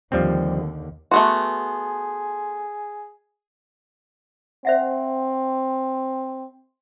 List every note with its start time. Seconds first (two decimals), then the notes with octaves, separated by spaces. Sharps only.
0.12 D#2 D3 F3 G3 C4
1.11 A3 B3 F#4 G#4 C6
4.65 C4 C5 E5 F#5